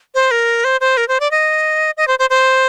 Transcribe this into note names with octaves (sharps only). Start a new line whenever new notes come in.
C5
A#4
C5
C5
A#4
C5
D5
D#5
D#5
C5
C5
C5